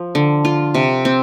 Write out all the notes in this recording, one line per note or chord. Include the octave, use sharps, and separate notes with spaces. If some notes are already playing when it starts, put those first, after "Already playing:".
Already playing: F3
D3
F4
C3
C4